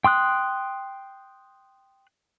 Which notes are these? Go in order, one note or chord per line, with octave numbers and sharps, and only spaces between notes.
G5 C6 D#6 F#6